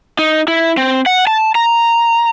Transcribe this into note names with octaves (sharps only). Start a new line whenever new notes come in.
D#4
E4
C4
F#5
A5
A#5